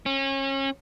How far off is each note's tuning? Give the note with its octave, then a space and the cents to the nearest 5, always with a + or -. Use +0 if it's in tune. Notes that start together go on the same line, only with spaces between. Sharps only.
C#4 -30